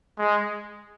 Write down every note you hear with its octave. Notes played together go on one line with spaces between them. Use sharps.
G#3